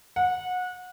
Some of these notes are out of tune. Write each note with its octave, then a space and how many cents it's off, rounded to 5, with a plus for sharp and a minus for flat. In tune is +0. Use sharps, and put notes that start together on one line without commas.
F#5 -25